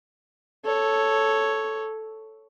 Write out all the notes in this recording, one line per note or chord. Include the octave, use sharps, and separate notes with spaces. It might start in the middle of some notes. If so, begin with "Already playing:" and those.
A4 C#5